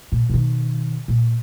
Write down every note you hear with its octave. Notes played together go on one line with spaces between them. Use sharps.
A#2
B2 D#3
A#2